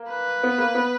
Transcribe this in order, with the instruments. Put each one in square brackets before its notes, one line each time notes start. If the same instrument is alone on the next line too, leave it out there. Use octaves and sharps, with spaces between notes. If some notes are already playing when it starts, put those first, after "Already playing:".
Already playing: [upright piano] A#3
[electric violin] B4
[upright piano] B3
A#3
B3